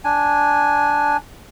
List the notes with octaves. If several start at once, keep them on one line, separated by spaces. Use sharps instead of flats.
D4 G#5